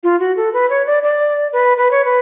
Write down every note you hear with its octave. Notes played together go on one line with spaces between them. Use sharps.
F4
F#4
A4
B4
C#5
D5
D5
B4
B4
C#5
B4